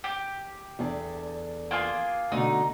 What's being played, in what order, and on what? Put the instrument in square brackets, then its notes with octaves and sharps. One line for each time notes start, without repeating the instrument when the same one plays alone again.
[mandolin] G4
[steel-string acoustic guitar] E2 D4 A4
[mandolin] A#3 F4 G#4
[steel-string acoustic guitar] B2 D3 A3 [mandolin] D#4